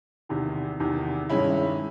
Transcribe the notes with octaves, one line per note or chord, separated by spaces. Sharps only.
E2 C3 D#3
E2 C3 D#3
G2 D#3 G#3 C#4 E4